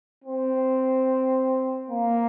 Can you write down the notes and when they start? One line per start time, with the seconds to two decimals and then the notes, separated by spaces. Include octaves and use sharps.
0.24 C4
1.90 A#3